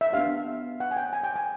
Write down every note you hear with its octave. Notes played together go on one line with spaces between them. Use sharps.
E5
B3 D4 G4 F5
F#5
G#5
G5
G#5
G5
G#5